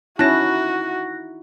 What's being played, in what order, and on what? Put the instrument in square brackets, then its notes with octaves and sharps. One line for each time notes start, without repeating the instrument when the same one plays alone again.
[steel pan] C#4 A5 [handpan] D#4 E4 [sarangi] F#4 [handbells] F#6 A#6